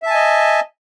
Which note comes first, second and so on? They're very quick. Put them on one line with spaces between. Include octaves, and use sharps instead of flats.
E5 A5 G#5 D#5